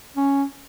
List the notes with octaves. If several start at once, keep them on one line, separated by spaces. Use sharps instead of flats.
C#4